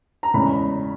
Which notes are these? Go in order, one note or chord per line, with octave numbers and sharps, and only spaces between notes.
A#5
E2 C#3 G#3 B5